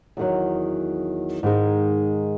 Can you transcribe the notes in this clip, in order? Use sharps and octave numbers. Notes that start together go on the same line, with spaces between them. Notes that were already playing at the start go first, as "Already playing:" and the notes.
E2 D#3 F#3
G#2 D#3 G#3 D#4